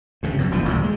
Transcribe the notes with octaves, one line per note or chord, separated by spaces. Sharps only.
G2 C#3
F#2 B2
E1 A1 A#2 F3
D2 A#2 D#3 F#3
G#3